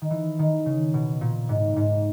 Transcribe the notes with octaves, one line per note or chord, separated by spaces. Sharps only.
D#3
E3
D#3
C#3
B2
A#2
G#2
G#2